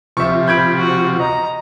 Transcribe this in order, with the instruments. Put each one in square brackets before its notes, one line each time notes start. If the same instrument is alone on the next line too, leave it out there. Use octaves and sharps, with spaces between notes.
[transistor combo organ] C3 F3 [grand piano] E5 C#6
[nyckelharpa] B5 [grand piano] G6 G#6 D7
[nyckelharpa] F#4
[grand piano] D#5 [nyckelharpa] A#5